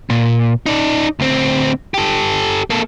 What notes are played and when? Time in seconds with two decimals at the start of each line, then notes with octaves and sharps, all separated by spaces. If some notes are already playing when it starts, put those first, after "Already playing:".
0.10 A#2
0.66 D#4 D5
1.19 D2 C4
1.94 G4 A4
2.70 A#3 A4